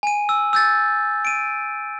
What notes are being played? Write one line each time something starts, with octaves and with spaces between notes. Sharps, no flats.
G#5 D#7
E6
E6 G6 A6
D7 D#7